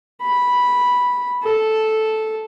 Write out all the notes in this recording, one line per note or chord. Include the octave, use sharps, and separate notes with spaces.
B5
A4